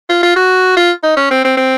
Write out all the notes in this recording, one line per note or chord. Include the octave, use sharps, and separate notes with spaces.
F4
F4
F#4
F4
D#4
C#4
C4
C4
C4